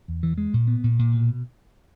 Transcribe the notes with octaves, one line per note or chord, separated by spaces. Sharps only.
E2
E3
G#3
A#2
B3
A#2
A#2
B2